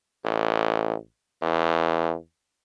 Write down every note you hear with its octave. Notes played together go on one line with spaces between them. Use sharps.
A1
E2